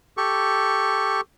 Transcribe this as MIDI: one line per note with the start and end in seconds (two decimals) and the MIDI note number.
0.17 1.21 67
0.17 1.21 69
0.17 1.21 85